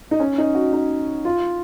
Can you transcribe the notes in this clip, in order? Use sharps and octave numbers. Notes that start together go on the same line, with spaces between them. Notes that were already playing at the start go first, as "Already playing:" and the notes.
D#4
C#4
D#4
F#4
D#4
F4